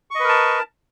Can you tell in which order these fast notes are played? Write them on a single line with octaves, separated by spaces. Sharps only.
C#6 D#5 B4 A#4 A5